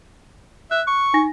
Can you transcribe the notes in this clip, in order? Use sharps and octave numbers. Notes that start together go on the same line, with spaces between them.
E5 F#6
C#6
D#4 G#5 A#6